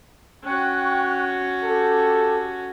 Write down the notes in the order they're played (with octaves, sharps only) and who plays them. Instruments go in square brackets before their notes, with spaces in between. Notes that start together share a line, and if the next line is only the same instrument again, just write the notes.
[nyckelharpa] C#4 F#4 [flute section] G5 C#6 F#6
[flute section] G4 [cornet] A4